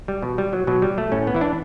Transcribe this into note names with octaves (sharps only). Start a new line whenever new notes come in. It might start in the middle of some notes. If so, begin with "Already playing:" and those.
G3
B2
G3
F#3
B2 F#3
G3
A3
A2 C#4
B3
E3 E4
D4